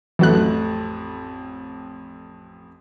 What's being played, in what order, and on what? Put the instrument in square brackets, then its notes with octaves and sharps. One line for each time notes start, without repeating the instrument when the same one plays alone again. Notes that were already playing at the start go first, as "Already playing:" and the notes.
[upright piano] A1 F2 A3 [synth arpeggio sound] E3 F#3 F#6